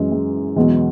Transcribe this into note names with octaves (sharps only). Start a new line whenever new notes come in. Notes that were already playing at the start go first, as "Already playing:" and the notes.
Already playing: F#2 E3 G#3
G#3
E2 B2 F#3 G#3